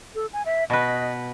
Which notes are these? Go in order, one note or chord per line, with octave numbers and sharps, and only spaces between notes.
A4
G#5
E5
B2 B4 D#5